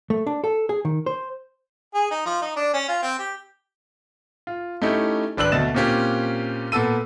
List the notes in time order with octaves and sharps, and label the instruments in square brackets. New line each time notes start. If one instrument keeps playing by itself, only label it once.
[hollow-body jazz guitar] A3
D4
A4
G#4
D#3
C5
[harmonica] G#4
D#4
F3
D#4
D4
C#4
F4
C4
G4
[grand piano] F4
A3 C#4 D#4 E4 G4
G#1 D4 B4 E6 F#6 F#7
D2 B2 D#5 A6 E7
A#2 A#3 C4 C#4 F4 G4
A#2 B3 A4 E6 D#7